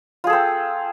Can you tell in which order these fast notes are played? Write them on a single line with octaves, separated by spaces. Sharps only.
F4 G#4 A4 C4